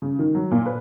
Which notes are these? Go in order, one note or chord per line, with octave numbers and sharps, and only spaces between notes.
C#3
D#3
F#3
A#2
B4